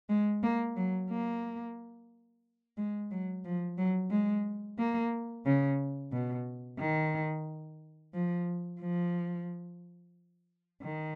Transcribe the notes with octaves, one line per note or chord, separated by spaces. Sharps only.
G#3
A#3
F#3
A#3
G#3
F#3
F3
F#3
G#3
A#3
C#3
B2
D#3
F3
F3
D#3